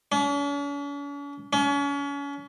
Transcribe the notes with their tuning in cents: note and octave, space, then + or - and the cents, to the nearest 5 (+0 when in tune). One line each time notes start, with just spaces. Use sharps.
C#4 +45
C#4 +35